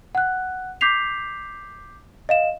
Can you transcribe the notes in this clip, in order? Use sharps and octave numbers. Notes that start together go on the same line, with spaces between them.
F#5 F#6
D6 G6 B6 C7 F7
D#5 F5 E7